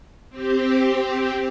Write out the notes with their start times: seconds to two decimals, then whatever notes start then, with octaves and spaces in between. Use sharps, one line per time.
0.29 C4 G4